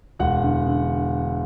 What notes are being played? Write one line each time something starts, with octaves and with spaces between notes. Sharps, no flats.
E1 F#5
D3
D3